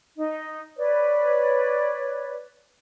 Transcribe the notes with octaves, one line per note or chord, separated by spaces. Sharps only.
D#4
B4 C#5 D5